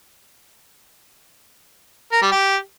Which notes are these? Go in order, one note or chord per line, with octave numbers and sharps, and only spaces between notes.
A#4
G3
G4